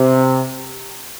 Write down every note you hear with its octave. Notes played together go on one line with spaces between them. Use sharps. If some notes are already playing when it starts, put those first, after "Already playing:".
Already playing: C3